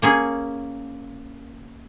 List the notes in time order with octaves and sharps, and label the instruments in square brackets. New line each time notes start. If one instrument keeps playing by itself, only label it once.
[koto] A#3 C#4 G#4